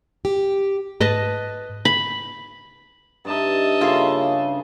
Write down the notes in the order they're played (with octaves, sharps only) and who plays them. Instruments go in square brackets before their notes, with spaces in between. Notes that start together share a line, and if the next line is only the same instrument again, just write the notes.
[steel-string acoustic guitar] G4
[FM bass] G#2 [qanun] B4 D#5 A5
[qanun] B5
[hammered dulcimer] G2 D#4 [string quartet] D#5 E5 A5
[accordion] C#3 [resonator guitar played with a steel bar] A#3 F4 A4